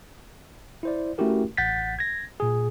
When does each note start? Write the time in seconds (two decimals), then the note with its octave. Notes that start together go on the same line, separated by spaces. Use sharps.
0.83 E4 C5 D5
1.18 A3 C#4 E4 F#4 G4 A#4
1.57 A1 F#5 G6 A6 B6
1.99 G#6 A#6
2.40 A#2 G#4